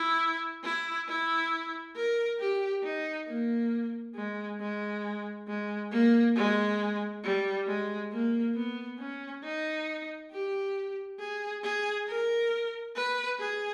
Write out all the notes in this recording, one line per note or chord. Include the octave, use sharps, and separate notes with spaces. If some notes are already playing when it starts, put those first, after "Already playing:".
Already playing: E4
E4
E4
A#4
G4
D#4
A#3
G#3
G#3
G#3
A#3
G#3
G3
G#3
A#3
B3
C#4
D#4
G4
G#4
G#4
A#4
B4
G#4